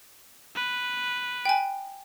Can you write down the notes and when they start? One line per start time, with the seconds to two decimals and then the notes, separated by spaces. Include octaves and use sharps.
0.55 B4
1.45 G5 G#5